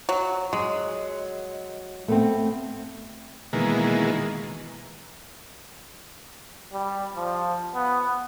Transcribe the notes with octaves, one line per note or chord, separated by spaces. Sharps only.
F#3
F#3 G#3
A3 B3 C4
B2 D#3 E3 G#3 A#3
G3
F3
B3